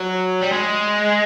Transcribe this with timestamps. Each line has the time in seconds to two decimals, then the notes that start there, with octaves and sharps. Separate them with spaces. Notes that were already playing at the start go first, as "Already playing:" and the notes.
Already playing: F#3
0.41 G3
0.52 G#3